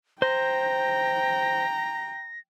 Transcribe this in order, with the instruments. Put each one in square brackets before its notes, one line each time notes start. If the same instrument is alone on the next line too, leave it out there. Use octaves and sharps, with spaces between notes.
[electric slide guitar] C5 [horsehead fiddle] G5 [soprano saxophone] A#5 [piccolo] A#6